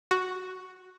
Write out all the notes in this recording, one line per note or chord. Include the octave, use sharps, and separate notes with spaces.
F#4